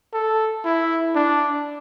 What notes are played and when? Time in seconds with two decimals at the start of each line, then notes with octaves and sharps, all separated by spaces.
0.13 A4
0.65 E4
1.16 D4